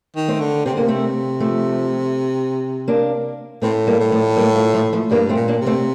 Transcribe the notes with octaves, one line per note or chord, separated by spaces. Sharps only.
D#3
A3 C4
D3
C3 C4
D3
A#3
C3
A3 C4
F3 A3
A#3 D4
A2 A3 C4
G3 A#3
A2
F3 A3
G3 A#3
F3 A3
F3 A3
F3 A3
G2 G3 A#3
A3 C4
A#2
A#3 D4
C3
A3 C4